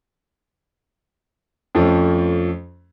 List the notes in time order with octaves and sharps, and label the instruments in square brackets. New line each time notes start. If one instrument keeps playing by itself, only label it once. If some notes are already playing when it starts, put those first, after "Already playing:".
[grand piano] F2 F3 A3 C#4